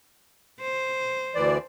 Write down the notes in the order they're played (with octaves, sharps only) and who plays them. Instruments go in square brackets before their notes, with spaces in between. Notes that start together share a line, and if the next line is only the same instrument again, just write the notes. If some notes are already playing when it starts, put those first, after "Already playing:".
[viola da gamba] C5
[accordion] D2 E3 D5